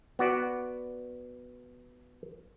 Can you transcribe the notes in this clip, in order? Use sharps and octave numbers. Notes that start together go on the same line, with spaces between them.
B3 F#4 D5